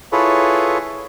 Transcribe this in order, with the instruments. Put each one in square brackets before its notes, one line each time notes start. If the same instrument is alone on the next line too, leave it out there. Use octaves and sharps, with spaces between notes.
[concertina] E4 F4 G#4 A4 B4 C#5